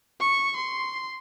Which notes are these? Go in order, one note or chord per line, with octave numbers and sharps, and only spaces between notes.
C#6
C6